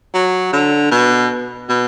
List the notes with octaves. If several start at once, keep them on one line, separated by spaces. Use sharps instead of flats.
F#3
D3
B2
B2